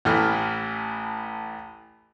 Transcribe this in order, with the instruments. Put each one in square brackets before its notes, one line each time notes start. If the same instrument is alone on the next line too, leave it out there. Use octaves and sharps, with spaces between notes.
[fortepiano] A1 E3 A3 F6